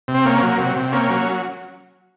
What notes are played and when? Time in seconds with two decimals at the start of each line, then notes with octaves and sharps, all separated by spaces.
0.08 C3
0.14 C4
0.25 A#3 C#4
0.42 F#3
0.59 C3
0.76 C3
0.92 A#3 C#4
1.09 F#3